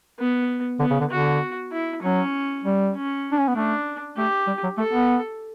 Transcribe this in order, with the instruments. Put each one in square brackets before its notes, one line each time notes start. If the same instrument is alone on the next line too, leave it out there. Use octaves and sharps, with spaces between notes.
[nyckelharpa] B3
[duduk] D3 [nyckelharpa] B3
[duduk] C#3
D3
[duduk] D3 [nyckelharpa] F#4
[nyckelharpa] E4
[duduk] F#3 [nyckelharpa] C#4
[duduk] G3
[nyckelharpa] C#4
[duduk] D4
C#4
B3
[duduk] A3 [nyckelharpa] D4
[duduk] A3 [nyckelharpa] G4
[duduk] G3
F#3
[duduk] A3 [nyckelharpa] A4
[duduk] B3